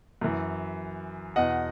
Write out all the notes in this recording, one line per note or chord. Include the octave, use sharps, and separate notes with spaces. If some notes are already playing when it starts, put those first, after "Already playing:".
F#2 E3
E2 B2 D#5 F#5